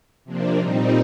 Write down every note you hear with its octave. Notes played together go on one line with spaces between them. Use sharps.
C3 F3 A#3 D4
A#2 G3 C4 D#4